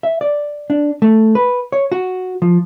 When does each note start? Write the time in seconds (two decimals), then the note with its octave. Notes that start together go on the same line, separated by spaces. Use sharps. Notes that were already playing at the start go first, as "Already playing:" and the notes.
0.03 E5
0.21 D5
0.70 D4
1.02 A3
1.35 B4
1.72 C#5
1.92 F#4
2.42 F3